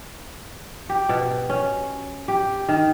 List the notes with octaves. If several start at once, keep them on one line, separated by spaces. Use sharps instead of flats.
G4
B2
C#4
G4
D#3